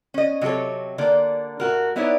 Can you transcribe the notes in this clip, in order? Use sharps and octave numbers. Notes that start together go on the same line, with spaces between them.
C#4 D#5
C3 F#3 F4 A4 C#5
D3 A#3 D5
A2 F#4 A#4
B3 D#4 E4 B4 C#5 D5